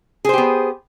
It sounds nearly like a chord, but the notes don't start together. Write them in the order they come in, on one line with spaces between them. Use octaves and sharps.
G#4 C5 G4 B3